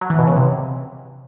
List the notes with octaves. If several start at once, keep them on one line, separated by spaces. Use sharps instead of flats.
F#3
E3
B2
C#3
C3